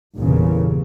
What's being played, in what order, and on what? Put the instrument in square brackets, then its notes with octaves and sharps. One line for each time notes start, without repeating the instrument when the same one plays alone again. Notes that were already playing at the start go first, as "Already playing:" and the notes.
[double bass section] G1 E2 A#2 C#3